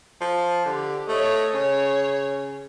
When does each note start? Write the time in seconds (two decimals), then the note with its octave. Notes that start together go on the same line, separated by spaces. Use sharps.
0.21 F3
0.65 D3 G4
1.09 A3 C#5 D#5
1.53 C#3 C#5